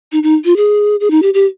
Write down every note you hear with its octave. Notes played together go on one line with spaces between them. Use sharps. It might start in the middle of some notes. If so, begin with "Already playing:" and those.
D#4
D#4
F4
G#4
G#4
D#4
G4
G4